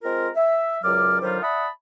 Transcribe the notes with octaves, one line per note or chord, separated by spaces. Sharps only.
G#3 C4 F4 A#4
E5
C#2 F#2 F#3 D5 D6 F6
D3 D#3 F#3 G3 F4 C5
D5 E5 F#5 A5 B5 D#6